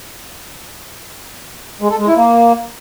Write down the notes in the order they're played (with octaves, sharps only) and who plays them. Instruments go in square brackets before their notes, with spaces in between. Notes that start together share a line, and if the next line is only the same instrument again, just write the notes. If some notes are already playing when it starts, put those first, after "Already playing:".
[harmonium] G#3
A4
G#3
E4
A#3